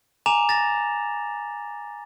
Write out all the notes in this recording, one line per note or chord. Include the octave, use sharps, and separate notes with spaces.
G#5 A#5 D6 E7 F7
A6 A#6